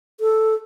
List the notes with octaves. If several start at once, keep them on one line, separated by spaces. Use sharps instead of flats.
A4